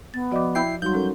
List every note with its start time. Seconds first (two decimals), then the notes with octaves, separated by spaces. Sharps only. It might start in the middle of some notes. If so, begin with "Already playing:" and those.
0.14 B3 A6
0.32 F3 F#4 D5 D#5 D6
0.55 E4 G5 C7
0.82 F#3 G3 D#4 F#4 C6 G6
0.93 C#4 A4 A#4